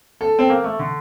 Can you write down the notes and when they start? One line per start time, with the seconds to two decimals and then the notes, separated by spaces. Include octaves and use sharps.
0.21 A4
0.39 C4
0.50 A#3
0.64 A3
0.79 D3